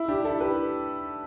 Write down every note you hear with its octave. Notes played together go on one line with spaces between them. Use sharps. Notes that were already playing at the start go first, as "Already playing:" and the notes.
Already playing: E4
D4 G4
E4 A4
G4 B4